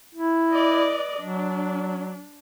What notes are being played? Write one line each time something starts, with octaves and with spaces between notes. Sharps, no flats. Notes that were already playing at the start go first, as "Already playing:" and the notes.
E4
B4 D5 D#5
F#3 D4